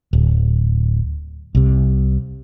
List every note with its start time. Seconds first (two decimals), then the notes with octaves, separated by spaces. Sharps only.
0.13 D1
1.55 C2 C3